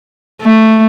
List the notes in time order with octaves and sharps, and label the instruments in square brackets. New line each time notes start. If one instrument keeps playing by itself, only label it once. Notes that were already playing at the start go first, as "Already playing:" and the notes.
[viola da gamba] A3